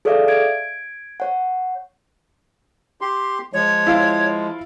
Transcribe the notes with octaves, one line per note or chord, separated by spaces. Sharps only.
G#4 A4 C#5 D5 E5 F5
G#6 D7
C#5 F#5
G4 C6
F3 G#3 C#5
E4 F4 F5